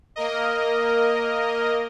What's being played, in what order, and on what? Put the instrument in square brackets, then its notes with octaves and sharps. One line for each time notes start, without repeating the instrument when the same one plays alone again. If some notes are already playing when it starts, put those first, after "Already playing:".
[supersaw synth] A#3 A#4 D#5